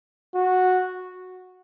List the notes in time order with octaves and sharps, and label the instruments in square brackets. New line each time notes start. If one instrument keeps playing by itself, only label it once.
[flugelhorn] F#4